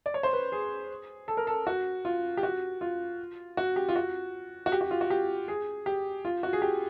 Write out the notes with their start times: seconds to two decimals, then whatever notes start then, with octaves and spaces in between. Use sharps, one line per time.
0.06 D5
0.14 C#5
0.23 C5
0.33 B4
0.52 G#4
1.28 A4
1.37 A#4
1.47 A4
1.67 F#4
2.05 F4
2.37 G4
2.43 F#4
2.81 F4
3.57 F#4
3.76 G4
3.89 F4
3.96 F#4
4.66 F#4
4.72 G4
4.81 F#4
4.91 F4
5.01 F#4
5.10 G4
5.48 G#4
5.86 G4
6.25 F4
6.43 F#4
6.53 G#4
6.62 G4